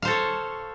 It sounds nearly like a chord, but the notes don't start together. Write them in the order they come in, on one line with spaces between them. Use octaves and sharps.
F5 C5 A4 C#5